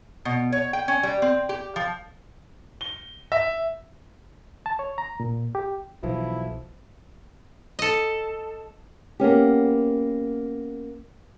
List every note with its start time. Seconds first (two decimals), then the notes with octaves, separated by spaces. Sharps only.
0.25 B2
0.52 C#5
0.73 G5
0.88 C#4
1.03 G3
1.22 C4
1.49 G4
1.76 F3
2.81 G7
3.32 E5
4.66 A5
4.79 C#5
4.98 A#5
5.20 A#2
5.55 G4
6.03 B1 E3 F3 E4
7.79 A4 D#5
9.20 A#3 B3 C#4 G4